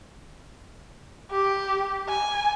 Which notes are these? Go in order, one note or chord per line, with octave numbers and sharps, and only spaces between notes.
G4
G#5